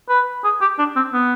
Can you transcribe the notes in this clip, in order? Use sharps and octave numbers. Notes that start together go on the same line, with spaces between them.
B4
G#4
G4
D4
C4
B3